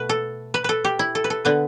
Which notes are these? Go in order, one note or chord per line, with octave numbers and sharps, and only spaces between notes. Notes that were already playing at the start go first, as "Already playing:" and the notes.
Already playing: B2 A3 B4
A4
B4
A4 B4
G4
E4
A4
B4
A4
D3 B3 B4